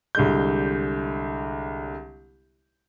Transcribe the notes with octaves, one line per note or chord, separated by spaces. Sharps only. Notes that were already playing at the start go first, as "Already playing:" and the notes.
C2 D3 G#3 G6